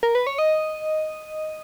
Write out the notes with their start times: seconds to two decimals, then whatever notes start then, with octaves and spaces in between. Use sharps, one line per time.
0.03 A#4
0.15 B4
0.27 C#5
0.39 D#5